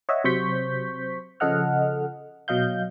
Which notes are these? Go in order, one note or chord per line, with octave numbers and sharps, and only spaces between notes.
C#5 D#5 E5 F#5
C3 F#3 C5 C#6 G6 B6
C#3 F3 A4 D#5 F#5 F6
B2 F#3 D#5 F5 G6